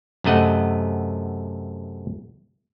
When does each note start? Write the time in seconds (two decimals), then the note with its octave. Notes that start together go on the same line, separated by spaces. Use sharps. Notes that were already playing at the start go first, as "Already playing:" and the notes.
0.24 F#2 C3 A3 D#5 F#5